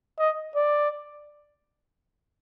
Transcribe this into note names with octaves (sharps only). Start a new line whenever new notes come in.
D#5
D5